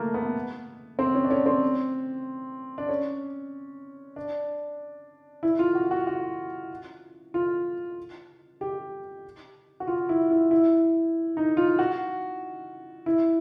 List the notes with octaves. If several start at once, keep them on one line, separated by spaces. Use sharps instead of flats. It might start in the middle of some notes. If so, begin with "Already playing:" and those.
Already playing: A3 A#3
B3
C4
C#4
D4
C#4
C4
D4
C#4
D4
E4
F4
F#4
F#4
F#4
F4
G4
F#4
F4
E4
E4
E4
D#4
F4
F#4
E4